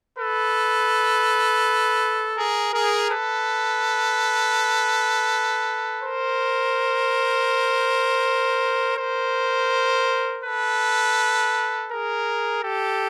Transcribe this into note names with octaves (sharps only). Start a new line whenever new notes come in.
A4 B4
G#4 A#4
G#4 A#4
A4 B4
A#4 C5
A#4 C5
A4 B4
G#4 A#4
G4 A4